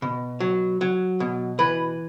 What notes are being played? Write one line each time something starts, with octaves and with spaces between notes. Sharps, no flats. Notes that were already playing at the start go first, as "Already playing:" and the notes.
B2
F#3
F#3
B2
E3 B4